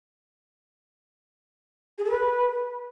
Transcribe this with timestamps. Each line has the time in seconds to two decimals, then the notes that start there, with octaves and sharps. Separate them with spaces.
1.98 G#4
2.04 A4
2.10 B4